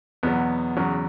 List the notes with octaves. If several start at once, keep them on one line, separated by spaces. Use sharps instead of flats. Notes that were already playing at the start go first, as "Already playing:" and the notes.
E2 B2 F#3 B3
E2 C#3 F#3